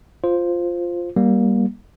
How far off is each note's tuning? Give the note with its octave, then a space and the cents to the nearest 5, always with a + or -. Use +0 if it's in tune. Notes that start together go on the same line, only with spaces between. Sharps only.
F4 +0 C5 +0
G3 +0 A#3 +25